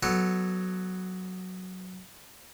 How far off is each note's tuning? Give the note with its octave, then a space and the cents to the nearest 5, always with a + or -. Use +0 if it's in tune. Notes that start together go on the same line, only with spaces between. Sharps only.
F#3 +0 B3 +0 A4 +0